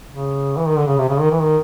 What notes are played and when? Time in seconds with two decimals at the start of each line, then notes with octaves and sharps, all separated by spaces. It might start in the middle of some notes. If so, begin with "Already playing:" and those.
0.10 C#3
0.57 E3
0.68 D#3
0.77 D3
0.87 C#3
0.98 C3
1.09 C#3
1.20 D#3
1.31 E3
1.41 D#3